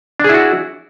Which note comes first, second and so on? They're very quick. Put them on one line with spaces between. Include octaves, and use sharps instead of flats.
D4 G#4 E4 F#4